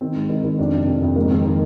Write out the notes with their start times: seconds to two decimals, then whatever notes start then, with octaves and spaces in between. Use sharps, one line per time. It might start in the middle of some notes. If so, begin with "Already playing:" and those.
0.01 D#3 C4
0.15 G#2
0.30 D#3
0.44 D#3
0.59 F2 D4
0.74 C3
0.87 F2
1.02 F2
1.16 G#2 A#3
1.30 D#3 C4
1.45 D#3